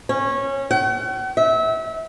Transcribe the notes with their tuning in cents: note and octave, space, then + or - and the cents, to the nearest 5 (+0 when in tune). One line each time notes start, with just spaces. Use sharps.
C#4 -20
F#5 +45
E5 -30